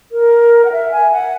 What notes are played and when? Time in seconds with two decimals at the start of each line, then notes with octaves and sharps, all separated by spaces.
0.12 A#4
0.65 F#5
0.72 E5
0.92 G#5
1.12 F#5